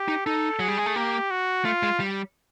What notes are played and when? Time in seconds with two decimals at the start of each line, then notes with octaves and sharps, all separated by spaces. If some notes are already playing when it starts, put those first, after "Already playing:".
Already playing: G4
0.08 D#4
0.26 D#4 A4
0.59 F#3 G#4
0.68 G3
0.78 G#3
0.86 A3
0.95 A#3 G4
1.31 F#4
1.65 A3 F4
1.83 G#3
2.00 G3